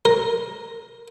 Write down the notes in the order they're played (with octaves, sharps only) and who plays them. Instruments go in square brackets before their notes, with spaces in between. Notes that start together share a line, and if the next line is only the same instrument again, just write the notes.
[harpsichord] A#4